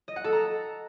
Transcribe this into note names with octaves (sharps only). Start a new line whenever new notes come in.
D#5
F#5
A4
A#5